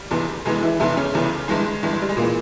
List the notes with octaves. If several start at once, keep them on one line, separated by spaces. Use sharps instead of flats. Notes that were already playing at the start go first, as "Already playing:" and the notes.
Already playing: G3
F1 E2 E3
F1 E2 E3 G#3
E3 E4
F1 E2 E3 E4
C#3 C#4
F1 E2 E3
G1 G2 E3 G#3
G1 G2 E3
G3
G#3
A#2 E3 A#3